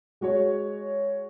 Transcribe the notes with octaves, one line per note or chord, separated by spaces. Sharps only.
G#3 F#4 C#5